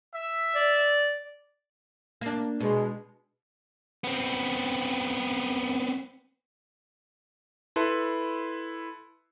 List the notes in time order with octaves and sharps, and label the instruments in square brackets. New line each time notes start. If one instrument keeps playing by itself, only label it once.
[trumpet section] E5
[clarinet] D5
[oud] A#3 D4
[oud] B2 [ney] G#3
[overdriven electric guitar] B3 C4
[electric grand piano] E4 A4 B4 C6